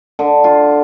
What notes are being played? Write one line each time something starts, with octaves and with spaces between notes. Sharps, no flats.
D3
F4